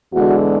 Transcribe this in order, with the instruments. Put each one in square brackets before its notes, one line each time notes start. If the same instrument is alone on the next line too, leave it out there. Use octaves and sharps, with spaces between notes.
[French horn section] E2 D3 G#3 F#4